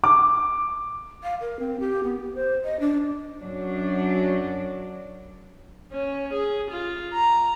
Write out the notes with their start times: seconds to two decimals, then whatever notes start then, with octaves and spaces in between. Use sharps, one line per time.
0.04 D6
1.23 F5
1.41 A#4
1.59 C4
1.80 G4
2.04 B3
2.20 G4
2.34 C5
2.65 D#5
2.80 D4
3.41 F#2 F#3 D4
5.92 C#4
6.33 G#4
6.70 F4
7.13 A#5